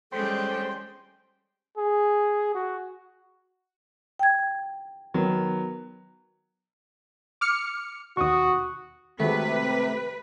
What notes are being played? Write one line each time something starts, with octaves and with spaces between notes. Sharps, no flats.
G3 G#3 C#4 A4 C5 G5
G#4
F#4
G5 G#6
D#3 F#3 B3
D6 F6 C#7
D#2 B2 F#4 C#6 D#6
C3 D#3 G#3 A3 F#4 B4